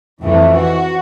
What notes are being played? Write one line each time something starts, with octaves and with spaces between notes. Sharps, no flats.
F2 E3 A3
F#4